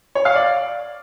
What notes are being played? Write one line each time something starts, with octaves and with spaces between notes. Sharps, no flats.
C#5
F5
D5